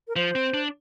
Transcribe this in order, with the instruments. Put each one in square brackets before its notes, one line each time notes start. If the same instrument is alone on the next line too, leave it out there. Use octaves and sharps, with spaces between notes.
[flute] A#4
[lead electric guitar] F3 [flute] C5
[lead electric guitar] C4
D4